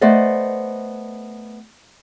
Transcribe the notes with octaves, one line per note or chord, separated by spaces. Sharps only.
A3 B3 C5 D5 D#5